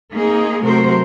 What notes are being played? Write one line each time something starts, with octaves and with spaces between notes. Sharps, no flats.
A#3 C4 D#4 G#4
C3 F#3 A3 F#4 A#4 C5